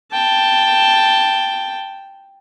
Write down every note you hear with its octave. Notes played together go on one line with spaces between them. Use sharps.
G5 A5